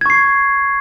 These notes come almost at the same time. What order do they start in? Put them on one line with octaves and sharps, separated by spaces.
G#6 C#6 C7